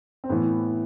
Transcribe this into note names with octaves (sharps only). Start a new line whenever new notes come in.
C4
A2 E3 B3